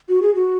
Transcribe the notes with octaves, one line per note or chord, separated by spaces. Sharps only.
F#4
G#4
F#4